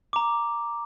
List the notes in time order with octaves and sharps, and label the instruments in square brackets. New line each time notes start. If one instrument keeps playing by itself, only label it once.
[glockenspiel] A#5 D6